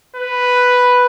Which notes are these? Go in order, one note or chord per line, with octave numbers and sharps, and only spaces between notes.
B4